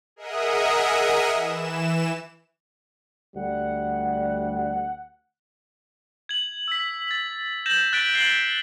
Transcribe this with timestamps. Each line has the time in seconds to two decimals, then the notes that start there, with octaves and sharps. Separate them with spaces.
0.16 G#4 A#4 D#5 E5 F#5 D#6
1.34 E3 E7
3.35 D2 G3 F#5
6.29 G#6 F#7
6.68 E6 B6
7.11 A6
7.66 G6 A#6 E7 F#7
7.93 F#6 A6 B6 D7
8.14 F#6 C7 D7 F#7 G7